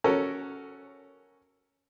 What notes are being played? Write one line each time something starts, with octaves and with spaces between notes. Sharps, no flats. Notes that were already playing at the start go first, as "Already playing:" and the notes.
C#4 F#4 A4 A#4